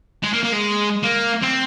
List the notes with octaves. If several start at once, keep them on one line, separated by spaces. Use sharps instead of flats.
G#3
A#3
A#3
G#3
A#3
C4